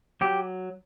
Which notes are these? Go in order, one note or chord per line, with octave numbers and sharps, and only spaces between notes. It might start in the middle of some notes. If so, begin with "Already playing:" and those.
F#3 G4